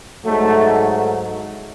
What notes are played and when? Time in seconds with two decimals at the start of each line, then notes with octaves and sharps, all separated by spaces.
0.24 G#2 F#3 A3